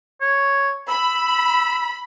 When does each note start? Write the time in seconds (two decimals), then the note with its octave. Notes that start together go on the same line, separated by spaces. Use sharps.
0.21 C#5
0.88 B5 E6